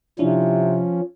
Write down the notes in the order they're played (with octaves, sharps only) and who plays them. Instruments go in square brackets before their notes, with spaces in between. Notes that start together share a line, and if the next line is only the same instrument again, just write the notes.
[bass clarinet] C3 [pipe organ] F3 C#4 [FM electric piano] D4 E4